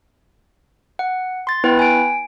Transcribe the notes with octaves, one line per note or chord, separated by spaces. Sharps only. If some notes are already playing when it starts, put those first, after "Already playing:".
F#5
C6 A6
B3 E4 B4 G5
G#5 D7